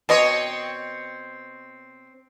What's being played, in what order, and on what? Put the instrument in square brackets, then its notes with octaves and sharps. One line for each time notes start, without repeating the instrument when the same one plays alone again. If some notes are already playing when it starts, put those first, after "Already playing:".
[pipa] B2 D#5 C6 [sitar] C4 C#5